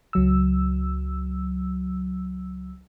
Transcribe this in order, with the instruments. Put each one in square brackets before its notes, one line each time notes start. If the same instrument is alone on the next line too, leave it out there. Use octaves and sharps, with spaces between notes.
[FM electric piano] C#2 F#3 E6